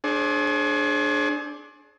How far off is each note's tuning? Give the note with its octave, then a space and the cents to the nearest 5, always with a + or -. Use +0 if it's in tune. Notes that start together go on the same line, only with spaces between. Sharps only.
D4 +0 G#4 +30 C5 +45